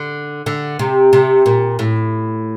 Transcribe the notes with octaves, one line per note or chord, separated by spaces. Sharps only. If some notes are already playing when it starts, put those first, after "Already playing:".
Already playing: D3
D3
C3
C3
A#2
A2